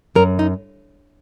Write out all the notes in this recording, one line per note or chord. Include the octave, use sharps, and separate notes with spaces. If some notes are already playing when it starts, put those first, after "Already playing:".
F#2 A#4
D#4